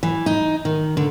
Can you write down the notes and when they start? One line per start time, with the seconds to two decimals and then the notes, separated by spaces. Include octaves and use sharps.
0.03 E3
0.26 D#4
0.65 D#3
0.97 D3